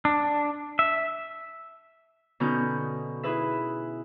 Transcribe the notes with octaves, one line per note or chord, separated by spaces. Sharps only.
D4
E5
B2 D3 B3 C#4 D#4 G6
E4 G#4 B4 E5